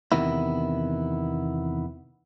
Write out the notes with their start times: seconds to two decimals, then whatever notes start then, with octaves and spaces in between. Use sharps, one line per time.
0.12 E2 C3 D#3 B3 E4